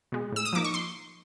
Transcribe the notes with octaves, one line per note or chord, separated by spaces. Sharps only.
B2 G#3
A2 E6
D#6
F3 A#3 D#4 D6
C#6
C6